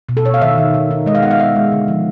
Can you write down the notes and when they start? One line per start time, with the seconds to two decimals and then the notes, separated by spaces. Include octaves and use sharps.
0.09 B2
0.17 A4
0.25 B2 C#5
0.34 F5
0.42 D#3 E5
0.58 D#3
0.74 D#3
0.91 D#4
1.06 G#3 D#5
1.15 F5
1.22 B3 F#5
1.31 F5
1.39 B3 E5
1.56 G#3
1.72 D3
1.88 F3